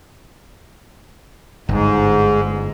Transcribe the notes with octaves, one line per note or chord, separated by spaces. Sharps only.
G1 G#2